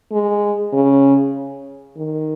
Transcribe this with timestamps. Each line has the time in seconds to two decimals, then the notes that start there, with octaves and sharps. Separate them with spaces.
0.12 G#3
0.73 C#3
1.96 D#3